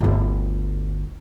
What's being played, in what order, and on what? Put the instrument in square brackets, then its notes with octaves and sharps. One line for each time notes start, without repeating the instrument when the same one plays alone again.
[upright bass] G1 D2